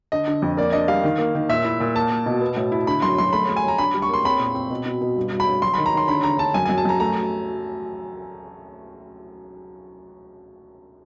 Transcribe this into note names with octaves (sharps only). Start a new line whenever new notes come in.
D3 D#5
D3
F2
A#3 D5
D4 D#5
G3 F5
D#3
A#3
D#3
A#2 E5
E4
A#2
A#3 A5
A#3
B2
B3
A2
E4
D3 B5
F#2 C6
F#2 C6
A3 B5
A3
G#5
F#3 A#5
D4 B5
G3
C#6
A#3 C6
C4 B5
A#2
C4
B2
B2
B2
G2
G2
B5
G2
F#3 C6
D#3 B5
A#5
D#3 C6
D3 B5
D3 A#5
D3 A5
F#2 G#5
F#2 G#5
A5
F#2 A#5
A3 A#5